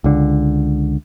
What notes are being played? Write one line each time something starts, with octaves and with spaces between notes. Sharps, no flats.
C#2 D3